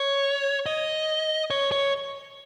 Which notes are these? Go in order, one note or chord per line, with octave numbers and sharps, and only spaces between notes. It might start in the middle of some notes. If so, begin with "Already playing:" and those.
Already playing: C#5
D#5
C#5
C#5